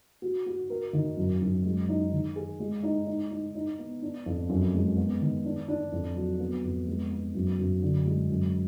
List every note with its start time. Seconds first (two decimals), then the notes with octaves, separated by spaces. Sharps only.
0.22 F#4
0.46 F#4
0.70 A#4
0.93 D#3
1.17 F#2
1.41 F#2
1.65 G#3
1.89 D#4
2.12 D#3
2.36 G#4
2.60 G#3
2.83 D#4
3.07 D#4
3.31 D#4
3.55 D#4
3.78 B3
4.02 D4
4.26 F2
4.49 F#2
4.74 G#3
4.97 B3
5.21 D#3
5.45 D4
5.68 D4
5.92 F2
6.16 F#3
6.40 B3
6.63 F2
6.87 G#3
7.11 B3
7.34 F#2
7.58 F#2
7.82 D3
8.06 G#3
8.29 F#2